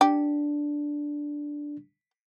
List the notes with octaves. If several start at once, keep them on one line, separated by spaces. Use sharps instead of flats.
D4 G4